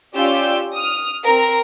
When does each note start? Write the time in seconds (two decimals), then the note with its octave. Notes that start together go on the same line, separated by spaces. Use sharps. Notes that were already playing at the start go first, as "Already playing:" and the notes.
0.15 C#4 F4 G4 D5 E6 G6
0.74 D#6 F6
1.24 C4 A#4 A#5